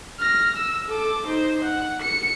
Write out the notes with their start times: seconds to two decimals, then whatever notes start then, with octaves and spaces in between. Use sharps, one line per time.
0.19 F6 A#6
0.56 E6
0.89 A4 D6
1.27 D#4 C5
1.64 F#5
2.02 C#7